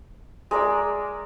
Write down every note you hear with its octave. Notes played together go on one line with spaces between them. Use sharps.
G#3 A#4 D5 E6